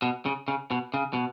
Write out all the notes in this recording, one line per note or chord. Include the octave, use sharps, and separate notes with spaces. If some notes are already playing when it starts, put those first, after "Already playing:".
B2
C#3
C#3
B2
C#3
B2